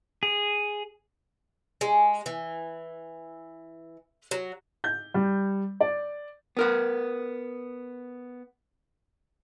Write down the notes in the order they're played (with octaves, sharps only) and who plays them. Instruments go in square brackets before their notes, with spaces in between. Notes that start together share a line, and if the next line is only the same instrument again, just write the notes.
[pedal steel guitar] G#4
[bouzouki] G#3
E3
F#3
[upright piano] G6
G3
D5
[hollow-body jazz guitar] B3 A#4 F#5